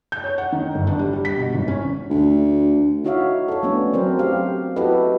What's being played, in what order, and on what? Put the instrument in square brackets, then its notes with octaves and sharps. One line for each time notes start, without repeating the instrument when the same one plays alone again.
[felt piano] G6
C#5
F#5
D#3
G1
D4
G3
G3
B6
B2
G#1
C#4
[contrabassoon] D2
[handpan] D#4 E4 F#4 C#5 E5 F5
A4 C#5
A3 B3 C#4 D4
F#3 C4 A#4 C5
G4 F5
E4 F#4 G4 A4 B4 D#5